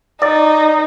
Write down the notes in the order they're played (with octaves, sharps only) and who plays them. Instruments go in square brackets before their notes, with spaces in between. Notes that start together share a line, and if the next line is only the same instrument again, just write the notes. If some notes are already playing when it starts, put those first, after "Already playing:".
[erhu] D#4 [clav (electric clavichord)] D5